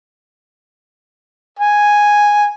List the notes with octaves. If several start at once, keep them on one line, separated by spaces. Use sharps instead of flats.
G#5